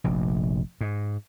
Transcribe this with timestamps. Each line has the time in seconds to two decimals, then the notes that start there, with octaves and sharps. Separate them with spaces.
0.04 F1 A#1
0.81 G#2